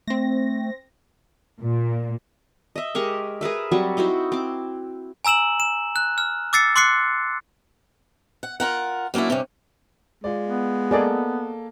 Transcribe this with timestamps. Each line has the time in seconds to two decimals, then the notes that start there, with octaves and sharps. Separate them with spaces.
0.07 A3 C4 A#6
1.61 A#2
2.76 D#5 E5
2.95 G#3 G4 A#4 C#6
3.41 G#4 A#4 B4 E5
3.72 F#3 G3 C4 C#6
3.97 D#4 E4 F#4 C5
4.32 C4 D6
5.25 G#5 A#5 E6 E7 F#7
5.60 E7
5.96 F#6
6.18 F6
6.53 D6 E6 A6 C7 C#7
6.76 C6 D6 F#6 C7 C#7
8.43 F#5
8.60 F4 A#4 F#5
9.14 F#3 A#3 C#4 D4 E4
9.30 G2 C3 C#4
10.24 G#3 F4 D5
10.46 B3
10.91 A#3 G#4 A4 D5 D#5